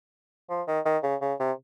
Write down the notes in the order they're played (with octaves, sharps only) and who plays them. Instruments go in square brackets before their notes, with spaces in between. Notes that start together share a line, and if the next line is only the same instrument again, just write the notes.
[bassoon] F3
D#3
D#3
C#3
C#3
C3